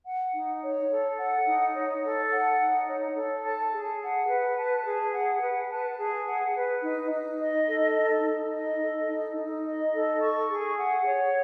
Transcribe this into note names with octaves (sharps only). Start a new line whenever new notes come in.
F#5
D#4
C#5
A4
F#5
D#4
C#5
A4
F#5
D#4
C#5
A4
A5
G#4
F#5
B4
A5
G#4
F#5
B4
A5
G#4
F#5
B4
D#4
D#4
D#5
A4
D#4
D#4
D#5
A4
D#4
D#4
D#5
A4
C#6
G#4
F#5
C#5